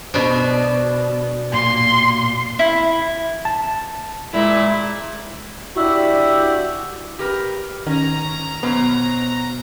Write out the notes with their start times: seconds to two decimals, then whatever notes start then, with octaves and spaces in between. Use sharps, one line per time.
0.14 B2 D4 C5
1.53 A#2 C6
2.59 E4
3.45 A5
4.33 A#2 G#3 E4
5.76 D4 E4 F#4 G4
7.19 G4 A#4 B4
7.87 D#3 C#4 A#5
8.63 B2 F#3 B3 C5